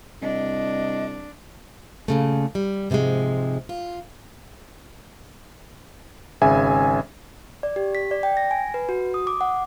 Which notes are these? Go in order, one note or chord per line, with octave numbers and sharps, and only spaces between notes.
C2 D4 D#5
A#2 C#3 A3
G3
G#2 C3 D#3 F3 G#3
F4
G#1 C#3 E5 G#5
D5
G4
B6
D5
G5
A#6
G#5
B4
F#4
D#6
D6
F#5